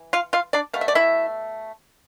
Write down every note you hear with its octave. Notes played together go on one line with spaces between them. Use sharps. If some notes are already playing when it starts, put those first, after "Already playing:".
Already playing: E3
F4 F5
F4 F5
D4 D5
B2 A3 F5
E5
D5
E4 E5